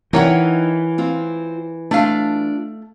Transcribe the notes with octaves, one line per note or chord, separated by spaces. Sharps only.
E3 D#4 A#4 C#5 F#5 G5
C4 F4
A3 D4 F4 F5